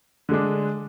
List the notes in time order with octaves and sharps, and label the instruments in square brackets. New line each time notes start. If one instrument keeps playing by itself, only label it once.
[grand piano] D3 G#3 D4